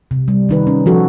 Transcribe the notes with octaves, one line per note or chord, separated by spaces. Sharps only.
C3
G3
D#3 D#4 B4
C#4
F3 F#4 A4